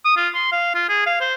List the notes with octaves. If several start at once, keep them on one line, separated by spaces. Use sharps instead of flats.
D#6
F4
C6
F5
F4
G#4
F5
C5